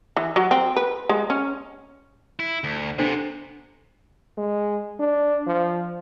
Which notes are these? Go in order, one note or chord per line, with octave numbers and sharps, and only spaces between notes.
E3
F#3
C4
B4
G#3
C#4
E4
D2
C3 B3 D4 A4 C5
G#3
D4
F3